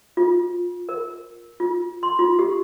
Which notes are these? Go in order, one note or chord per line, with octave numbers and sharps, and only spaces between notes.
F4
A#4
F4
C6
F4
G4